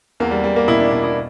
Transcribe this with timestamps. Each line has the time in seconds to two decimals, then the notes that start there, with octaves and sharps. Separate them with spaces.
0.20 E2 A#3
0.31 G3
0.43 E2 G3
0.56 A#3
0.68 B2 E4
0.80 D4
0.91 B2 D4
1.04 E4